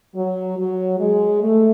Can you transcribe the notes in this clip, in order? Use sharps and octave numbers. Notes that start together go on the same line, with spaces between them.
F#3
F#3
G#3
A3